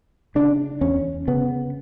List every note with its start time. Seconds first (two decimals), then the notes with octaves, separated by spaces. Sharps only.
0.35 C#3 D4
0.81 E2 C#4
1.28 C#3 B3